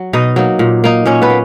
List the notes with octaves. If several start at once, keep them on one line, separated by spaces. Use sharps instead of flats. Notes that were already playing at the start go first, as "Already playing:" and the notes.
Already playing: F#3
B2 D#4 D#5
F#3 A#3 D#4
A#2
A#3 D#4
A#2 C#4 C#5
B3 B4
A#3